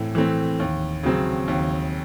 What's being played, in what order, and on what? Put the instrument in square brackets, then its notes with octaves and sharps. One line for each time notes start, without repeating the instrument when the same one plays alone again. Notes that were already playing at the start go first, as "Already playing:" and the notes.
Already playing: [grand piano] A2 E3 C4
E3 A3 C4
D#2
C#3 F#3 C4
D#2